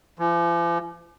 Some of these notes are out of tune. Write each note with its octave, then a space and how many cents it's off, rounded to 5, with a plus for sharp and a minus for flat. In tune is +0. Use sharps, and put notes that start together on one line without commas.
F3 -45